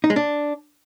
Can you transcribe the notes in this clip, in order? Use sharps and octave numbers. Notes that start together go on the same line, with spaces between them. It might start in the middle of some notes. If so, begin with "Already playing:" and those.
D#4
G#3
D4